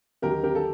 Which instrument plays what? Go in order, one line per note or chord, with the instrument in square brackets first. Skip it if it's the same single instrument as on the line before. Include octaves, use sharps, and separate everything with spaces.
[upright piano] D#2 D3 F#3 G4 A#4
G4 A#4
A4